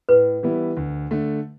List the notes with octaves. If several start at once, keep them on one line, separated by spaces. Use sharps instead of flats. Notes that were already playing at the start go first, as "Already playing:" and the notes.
A2 B4
E3 G3 B3 E4
D2
D3 A3